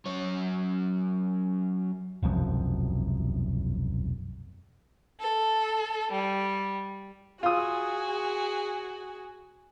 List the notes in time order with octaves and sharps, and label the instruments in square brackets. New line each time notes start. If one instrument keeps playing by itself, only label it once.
[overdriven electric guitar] F#2 C#5
[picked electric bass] E1 C2 F#2 F3
[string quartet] A4
G3
[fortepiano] F4 D#6 [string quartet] F#4 G#4